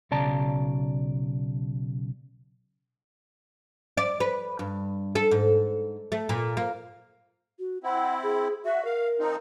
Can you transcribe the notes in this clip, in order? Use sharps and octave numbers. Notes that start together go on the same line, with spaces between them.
B1 C#3 D5 A5 A#5
D5
B4
G2
A4
G#2
A3
A#2
A#3
F#4
C4 E4 F#5
G#4
F#4 E5
A#4 F5
F3 C4 D#4